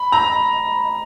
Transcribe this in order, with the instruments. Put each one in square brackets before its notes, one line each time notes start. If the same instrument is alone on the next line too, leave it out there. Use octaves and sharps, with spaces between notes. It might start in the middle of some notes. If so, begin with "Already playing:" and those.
Already playing: [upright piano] B5
A#5